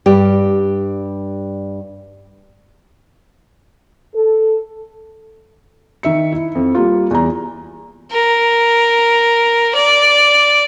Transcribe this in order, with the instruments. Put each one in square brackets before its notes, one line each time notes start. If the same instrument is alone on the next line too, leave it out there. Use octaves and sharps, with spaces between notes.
[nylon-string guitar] G2 G4
[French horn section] A4
[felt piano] D#3 E5 C#7
E4
F2
G3 A#3 F4
E2 A#5
[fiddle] A#4
D5